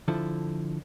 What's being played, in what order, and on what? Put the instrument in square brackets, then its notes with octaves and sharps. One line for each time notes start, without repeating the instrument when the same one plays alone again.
[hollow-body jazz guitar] D3 F3 E4 A4